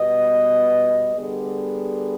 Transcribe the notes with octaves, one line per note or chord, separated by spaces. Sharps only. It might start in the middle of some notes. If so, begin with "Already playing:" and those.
Already playing: B2 G3 B3 D#5
D3 G3 B3 G#4